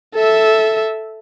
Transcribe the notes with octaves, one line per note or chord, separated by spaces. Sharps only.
A4 E5